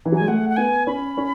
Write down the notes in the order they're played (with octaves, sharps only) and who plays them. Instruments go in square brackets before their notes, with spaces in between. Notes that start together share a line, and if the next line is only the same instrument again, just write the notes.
[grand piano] E3
F#3
[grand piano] G#3 [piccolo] G#5
[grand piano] A3 [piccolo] F#5
[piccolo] F#5
[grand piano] B3 [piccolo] G#5
[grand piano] C#4 [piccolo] B5
[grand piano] C#4